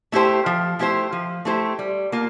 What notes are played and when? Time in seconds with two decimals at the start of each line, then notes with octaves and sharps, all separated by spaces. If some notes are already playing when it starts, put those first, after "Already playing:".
0.12 A3 E4 G4 C5
0.46 F3
0.79 A3 E4 G4 C5
1.12 F3
1.45 A3 E4 G4 C5
1.79 G3
2.12 A#3 F4